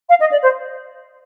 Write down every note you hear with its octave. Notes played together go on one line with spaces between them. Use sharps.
F5
D#5
D5
C5